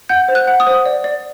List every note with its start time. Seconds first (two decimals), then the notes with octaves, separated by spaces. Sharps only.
0.09 F#5 G6
0.28 C5
0.35 F#6
0.47 F#5
0.60 D#6
0.67 C5
0.86 D5
1.04 D5